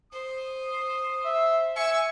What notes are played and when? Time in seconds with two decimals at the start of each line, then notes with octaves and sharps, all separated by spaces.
0.13 C5 D#6
1.25 E5
1.76 E5 G#5 C#6 E6